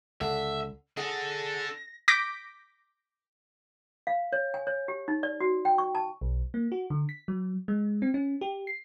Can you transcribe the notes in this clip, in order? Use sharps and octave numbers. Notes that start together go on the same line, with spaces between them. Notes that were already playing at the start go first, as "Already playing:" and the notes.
C#2 D3 E5
D4 G#4 A4 F#5 A#6
D6 G6 A#6 B6 D7
F5
C#5
G#5
C#5
G4
D#4
D5
F#4
G5
C#6
A5
B1
A#3
F#4
D3
B6
F#3
G#3
C4
C#4
G4
C7